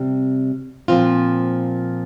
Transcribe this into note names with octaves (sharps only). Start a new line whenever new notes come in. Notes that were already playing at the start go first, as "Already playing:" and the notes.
Already playing: C3 G3
A#2 F3 C4 F4